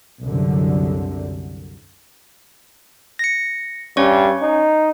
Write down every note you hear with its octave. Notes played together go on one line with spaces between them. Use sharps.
C2 F#2 D3
A#6 C#7
G2 C#4 C#5 C#6
D#4